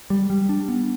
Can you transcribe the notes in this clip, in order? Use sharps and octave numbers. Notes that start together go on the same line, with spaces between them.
G3
G3
D4
B3